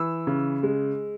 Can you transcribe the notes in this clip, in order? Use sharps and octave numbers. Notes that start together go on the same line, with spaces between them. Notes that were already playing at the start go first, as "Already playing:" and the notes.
Already playing: E3 E6
C#3
G#3